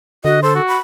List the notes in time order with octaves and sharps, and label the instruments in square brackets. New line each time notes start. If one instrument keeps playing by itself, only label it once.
[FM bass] D3 [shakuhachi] F#4 [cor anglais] D#5
[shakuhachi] A4 [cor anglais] C5
[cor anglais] F#4
[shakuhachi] B5